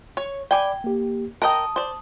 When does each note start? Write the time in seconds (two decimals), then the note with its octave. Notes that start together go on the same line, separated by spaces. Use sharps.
0.17 C#5
0.51 D5 G5 G#5 B5 D6
0.84 A#3 G4
1.42 A#4 D#5 G5 A5 D#6
1.76 C5 D5